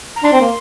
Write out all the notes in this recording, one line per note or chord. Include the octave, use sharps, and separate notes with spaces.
A#5
D4 C6
C4
A#3